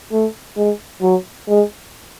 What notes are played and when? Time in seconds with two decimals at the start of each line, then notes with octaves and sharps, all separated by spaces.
0.12 A3
0.57 G#3
1.02 F#3
1.48 G#3